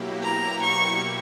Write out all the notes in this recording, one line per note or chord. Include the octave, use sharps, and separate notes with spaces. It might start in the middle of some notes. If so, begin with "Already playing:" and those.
Already playing: B2 F#3 A#3 E4 G4
A#5
C#6